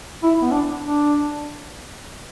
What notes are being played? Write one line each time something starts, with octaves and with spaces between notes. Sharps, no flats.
E4
B3
D4
D4